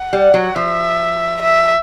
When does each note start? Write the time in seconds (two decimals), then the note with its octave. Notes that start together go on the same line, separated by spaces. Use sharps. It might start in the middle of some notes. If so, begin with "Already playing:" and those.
Already playing: F#5
0.13 G3
0.34 F#3
0.55 F3 E5
1.41 E5